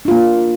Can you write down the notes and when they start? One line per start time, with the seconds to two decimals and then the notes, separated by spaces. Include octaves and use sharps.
0.05 D4
0.08 F4
0.11 A#3